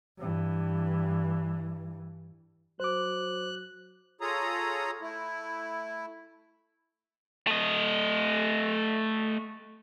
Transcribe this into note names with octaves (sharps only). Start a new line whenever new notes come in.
G2 E3
F#3 C5 D6 F#6
F4 G#4 A4 C#5 A#5 D#6
A3 E4
A3 D#5